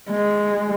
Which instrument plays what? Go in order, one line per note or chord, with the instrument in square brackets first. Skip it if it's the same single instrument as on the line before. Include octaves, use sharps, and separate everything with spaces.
[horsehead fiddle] G#3